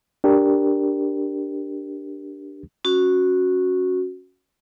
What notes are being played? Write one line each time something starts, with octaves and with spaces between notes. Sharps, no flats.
D4 G4 A#4
C#4 F#4